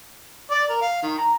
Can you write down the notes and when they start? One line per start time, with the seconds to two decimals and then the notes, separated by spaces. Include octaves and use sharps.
0.51 D5
0.69 A#4
0.81 F5
1.02 D#3
1.18 A#5